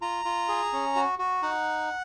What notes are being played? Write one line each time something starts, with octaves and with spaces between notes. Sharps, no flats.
F4 A#5
F4
G#4
C#4
F#4
F#4
D#4 F#5